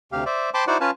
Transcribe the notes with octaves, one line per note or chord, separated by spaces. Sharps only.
D2 C3 G4 F5
C5 D5 E5
C5 G5 A5 B5 C6 D6
D#4 E4 F#4 C5 D5 F#5
C#4 F4 B4 F5 G#5 A5